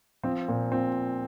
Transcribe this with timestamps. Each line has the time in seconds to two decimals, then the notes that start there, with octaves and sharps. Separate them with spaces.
0.24 F3 C4
0.48 A#2
0.72 A#2 C4